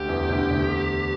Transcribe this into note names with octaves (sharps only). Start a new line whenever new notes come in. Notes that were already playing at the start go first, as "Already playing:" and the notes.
Already playing: D2 D3 G4
E2 E3
D2 D3
D2 D3